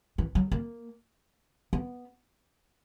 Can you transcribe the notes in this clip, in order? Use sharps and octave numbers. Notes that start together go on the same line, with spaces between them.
E3
F#3
A#3
B3